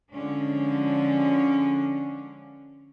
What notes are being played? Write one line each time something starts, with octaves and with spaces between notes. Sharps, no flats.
D3 F3 G#3 C#4 D4